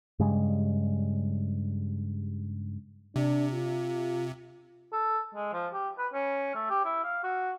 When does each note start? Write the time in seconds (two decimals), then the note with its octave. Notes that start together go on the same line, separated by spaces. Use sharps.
0.19 G2 C#3 G3 G#3
3.16 C3 D4
3.52 F4
4.93 A4
5.35 G#3
5.53 F3
5.73 G4
5.98 B4
6.13 C#4
6.55 A3
6.70 G4
6.85 E4
7.04 F5
7.23 F#4